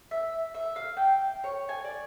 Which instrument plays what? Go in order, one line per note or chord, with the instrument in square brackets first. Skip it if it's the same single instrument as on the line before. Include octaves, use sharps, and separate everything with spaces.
[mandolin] E5
E5
F5
G5
C#5
G#5
D5